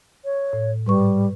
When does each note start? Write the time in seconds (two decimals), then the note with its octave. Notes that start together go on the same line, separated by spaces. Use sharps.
0.25 C#5
0.53 A2
0.87 G#2 G3 B4 C#6